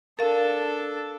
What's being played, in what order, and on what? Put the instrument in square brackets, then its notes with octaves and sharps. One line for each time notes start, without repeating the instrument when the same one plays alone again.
[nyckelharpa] D4 A4 [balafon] A#4 F5